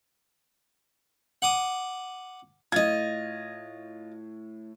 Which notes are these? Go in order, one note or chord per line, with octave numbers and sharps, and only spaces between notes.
F#5 D6 D#6
A2 F4 D#5 G#6